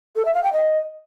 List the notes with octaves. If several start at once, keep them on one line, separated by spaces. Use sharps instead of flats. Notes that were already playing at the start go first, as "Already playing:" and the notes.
A4
E5
F5
G5
D#5